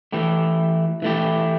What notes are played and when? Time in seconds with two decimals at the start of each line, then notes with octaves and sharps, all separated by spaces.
0.12 E3 A3 E4 G4
1.02 E3 A3 E4 G4